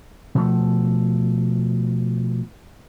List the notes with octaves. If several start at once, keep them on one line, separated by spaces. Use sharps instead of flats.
B2 F3 A3